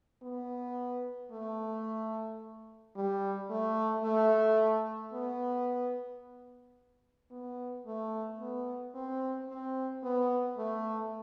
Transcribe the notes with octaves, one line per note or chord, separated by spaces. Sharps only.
B3
A3
G3
A3
A3
B3
B3
A3
B3
C4
C4
B3
A3